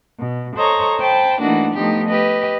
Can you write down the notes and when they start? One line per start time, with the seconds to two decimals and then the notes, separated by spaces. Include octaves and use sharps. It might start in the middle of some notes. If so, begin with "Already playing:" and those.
0.18 B2
0.55 A4 C5 C#5 D#5 A#5 C#6
0.99 C5 G5 A5 B5
1.41 E3 A3 A#3 D4 D#4 F#4
1.74 F3 A3 B3 D#4 G4
2.08 G4 B4 D#5